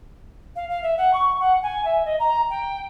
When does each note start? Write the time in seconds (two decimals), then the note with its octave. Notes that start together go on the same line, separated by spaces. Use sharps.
0.55 F5
0.69 F5
0.82 E5
0.97 F#5
1.13 C#6
1.39 F#5
1.62 G#5
1.84 E5
2.05 D#5
2.19 A#5
2.49 G5